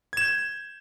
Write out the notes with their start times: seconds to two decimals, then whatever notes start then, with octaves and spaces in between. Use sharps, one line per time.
0.13 G#6
0.17 E7
0.21 G6